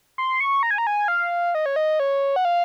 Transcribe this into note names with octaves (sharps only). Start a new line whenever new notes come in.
C6
C#6
A#5
G#5
A#5
G#5
F5
D#5
C#5
D#5
C#5
F#5
F5